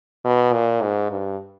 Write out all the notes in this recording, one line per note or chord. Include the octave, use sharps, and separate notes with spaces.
B2
A#2
G#2
G2